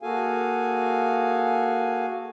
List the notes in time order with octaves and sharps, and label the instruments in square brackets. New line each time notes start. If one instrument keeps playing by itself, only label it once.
[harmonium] A#3 F#4 G#4 A4 F5 G#5